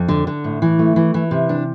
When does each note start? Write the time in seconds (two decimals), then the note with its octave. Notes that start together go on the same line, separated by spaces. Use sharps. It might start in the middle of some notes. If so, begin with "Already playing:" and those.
Already playing: F2
0.08 D3
0.27 D3
0.44 A2
0.62 E3
0.79 A3
0.96 E3
1.14 E3
1.31 C3
1.49 D4